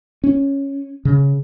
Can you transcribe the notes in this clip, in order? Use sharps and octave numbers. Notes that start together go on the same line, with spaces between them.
C#4
C#3